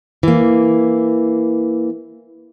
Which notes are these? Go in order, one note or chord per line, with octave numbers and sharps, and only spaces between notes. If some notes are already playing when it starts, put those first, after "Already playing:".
E3 A#3